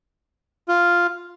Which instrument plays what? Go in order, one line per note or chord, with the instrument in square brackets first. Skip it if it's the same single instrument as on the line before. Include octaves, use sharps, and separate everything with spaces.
[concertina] F4